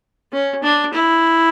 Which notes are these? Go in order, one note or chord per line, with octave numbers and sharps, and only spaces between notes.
C#4
D4
E4